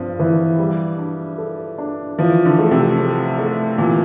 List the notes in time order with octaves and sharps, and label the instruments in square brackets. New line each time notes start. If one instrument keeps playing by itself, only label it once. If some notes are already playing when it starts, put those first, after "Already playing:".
Already playing: [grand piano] G2 C4 [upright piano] F3
[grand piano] E3
G3
D4
A4
D4
[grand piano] E3 [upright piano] F3
[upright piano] D3
[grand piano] A3
[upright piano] C3
[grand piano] A3
A3
[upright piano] A#2 [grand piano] E3